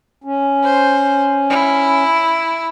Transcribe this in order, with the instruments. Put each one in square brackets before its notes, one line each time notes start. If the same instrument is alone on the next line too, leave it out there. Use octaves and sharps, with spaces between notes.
[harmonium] C#4
[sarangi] C5
E4